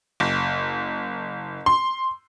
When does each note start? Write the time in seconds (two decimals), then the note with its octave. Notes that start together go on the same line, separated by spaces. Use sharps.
0.20 F#1
1.66 C6